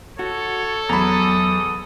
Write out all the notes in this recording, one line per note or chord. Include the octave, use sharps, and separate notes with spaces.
F#4 A4 C#5
E2 F#3 A#5 B5 D#6